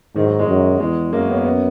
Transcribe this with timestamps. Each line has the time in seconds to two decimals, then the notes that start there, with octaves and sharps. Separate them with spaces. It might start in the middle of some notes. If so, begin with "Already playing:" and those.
0.15 G#2 D#3
0.24 F#3
0.39 G#3
0.48 F#2
0.80 E2 G#3
1.12 F#2 A#3
1.20 C#4
1.28 B3
1.36 C#4
1.44 B3